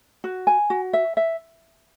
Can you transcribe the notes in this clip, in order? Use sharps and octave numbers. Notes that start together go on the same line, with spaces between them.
F#4
G#5
F#4
E5
E5